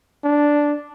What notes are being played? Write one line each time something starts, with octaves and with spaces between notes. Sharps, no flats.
D4